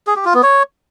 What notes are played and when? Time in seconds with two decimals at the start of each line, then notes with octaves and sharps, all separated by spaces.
0.07 G#4
0.16 G4
0.25 F4
0.34 B3
0.43 C#5